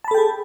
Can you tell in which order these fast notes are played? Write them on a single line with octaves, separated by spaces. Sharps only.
A5 B5 A4 G5 G#4